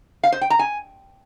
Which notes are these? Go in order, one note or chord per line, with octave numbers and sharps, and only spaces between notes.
F5
C5
G5
A#5
G#5